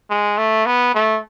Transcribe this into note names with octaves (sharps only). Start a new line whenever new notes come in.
G#3
A3
B3
A3